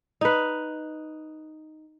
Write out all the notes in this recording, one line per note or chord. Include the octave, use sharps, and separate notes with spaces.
D#4 B4